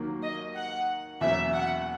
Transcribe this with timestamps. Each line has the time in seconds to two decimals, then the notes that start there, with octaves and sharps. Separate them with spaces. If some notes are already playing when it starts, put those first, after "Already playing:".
Already playing: D#2 D#3 F#3 A#3
0.23 D#5
0.55 F#5
1.21 E2 B2 F#3 A#3 C#4 E5
1.54 F#5